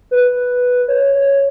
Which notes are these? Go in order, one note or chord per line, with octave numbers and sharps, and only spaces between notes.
B4
C#5
C#5